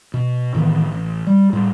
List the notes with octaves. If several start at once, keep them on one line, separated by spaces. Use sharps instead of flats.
B2
A2 D#3 E3 B3
A1
G3
A2 G3